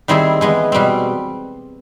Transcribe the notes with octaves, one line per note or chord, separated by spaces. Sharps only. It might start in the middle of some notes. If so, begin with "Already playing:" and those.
D#3 G3 C4 E4 G#4
E3 G#3 B3
B2 G3 C4